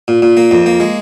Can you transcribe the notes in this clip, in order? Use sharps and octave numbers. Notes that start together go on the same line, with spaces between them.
A#2
A#2
A#3
F2
A#3
G#3